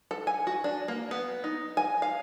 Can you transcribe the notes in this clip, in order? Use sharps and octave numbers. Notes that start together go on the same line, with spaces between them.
A4
G#5
F#4
D4
A#3
B3
D#4
G#5
F5